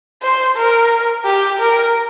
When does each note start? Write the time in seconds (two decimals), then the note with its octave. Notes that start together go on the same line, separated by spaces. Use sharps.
0.22 C5
0.57 A#4
1.25 G4
1.59 A#4